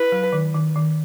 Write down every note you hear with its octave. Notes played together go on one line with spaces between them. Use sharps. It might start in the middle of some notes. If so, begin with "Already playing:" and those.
Already playing: E4 B4
F#3
D#3
D#3
D#3